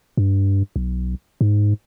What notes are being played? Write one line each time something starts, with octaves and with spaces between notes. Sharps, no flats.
G2
B1
G#2